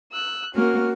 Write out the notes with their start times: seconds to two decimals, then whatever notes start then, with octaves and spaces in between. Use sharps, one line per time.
0.12 E6 F#6
0.55 A#3 C#4 F#4 F6